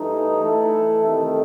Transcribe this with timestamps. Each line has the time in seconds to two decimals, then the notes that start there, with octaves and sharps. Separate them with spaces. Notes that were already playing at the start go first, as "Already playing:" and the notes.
Already playing: G2 E3 A3 D#4
0.42 E3 A3 E4 A4
1.00 C3 D#3 A3